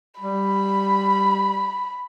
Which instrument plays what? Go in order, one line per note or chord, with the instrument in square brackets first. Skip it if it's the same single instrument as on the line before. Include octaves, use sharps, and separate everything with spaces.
[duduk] G3 [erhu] B5